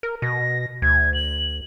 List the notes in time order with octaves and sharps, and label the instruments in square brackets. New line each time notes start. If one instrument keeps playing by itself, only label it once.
[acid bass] A#4
[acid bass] B2 [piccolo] A#6
[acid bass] D2 [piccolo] G#6
[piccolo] F#7